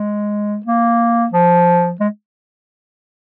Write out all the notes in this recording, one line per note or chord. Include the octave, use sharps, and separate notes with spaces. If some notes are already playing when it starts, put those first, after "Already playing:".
Already playing: G#3
A#3
F3
G#3